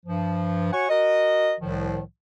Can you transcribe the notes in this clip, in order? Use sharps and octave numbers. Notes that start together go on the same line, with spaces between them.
G2 F3
F#4 C#5 F#5 G#5 C#6
F#4 A#4 D#5
C2 A2 D#3 F3